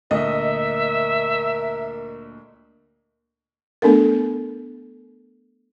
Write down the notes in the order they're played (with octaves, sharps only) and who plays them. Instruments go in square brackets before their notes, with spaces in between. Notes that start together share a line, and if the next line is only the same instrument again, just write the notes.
[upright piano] D2 A#2 [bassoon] A#4 [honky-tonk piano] D#5 [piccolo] E5
[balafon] A3 B3 D4 A4 A#4